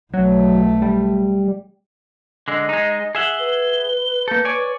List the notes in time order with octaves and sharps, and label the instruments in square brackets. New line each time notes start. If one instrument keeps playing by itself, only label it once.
[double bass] B1 A3 [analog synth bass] F#3
[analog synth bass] G3
[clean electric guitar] D3 G#3 [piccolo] D#5
[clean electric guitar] G#3 D#4
[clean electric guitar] G#4 E5 F#5 [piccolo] G7
[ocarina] B4
[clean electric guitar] A#3 A4 [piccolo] G6
[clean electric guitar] C#5 D5 G#5 [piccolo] D6